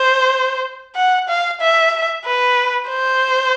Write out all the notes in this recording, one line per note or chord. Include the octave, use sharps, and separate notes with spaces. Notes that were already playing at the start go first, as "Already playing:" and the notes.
Already playing: C5
F#5
F5
E5
B4
C5